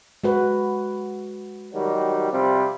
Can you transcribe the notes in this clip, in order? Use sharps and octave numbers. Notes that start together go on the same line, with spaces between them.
G#3 F#4 B4
D#3 F#3 G3
C3 F3 G3